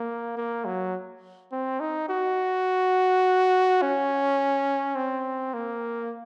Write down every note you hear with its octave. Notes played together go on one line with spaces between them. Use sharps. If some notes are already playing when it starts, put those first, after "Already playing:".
Already playing: A#3
A#3
F#3
C4
D#4
F#4
C#4
C4
A#3